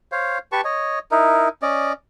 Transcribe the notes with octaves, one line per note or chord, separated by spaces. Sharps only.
C5 C#5 F5
G4 B4 A5 C#6
C#5 D#5
D#4 E4 A#4
C#4 D5 D#5